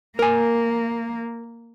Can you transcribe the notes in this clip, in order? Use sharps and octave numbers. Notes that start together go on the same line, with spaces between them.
A#3 A#4 G#5